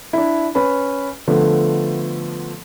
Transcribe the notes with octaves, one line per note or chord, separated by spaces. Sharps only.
D4 E4
C#4 B4 B5
D3 F3 A3 B3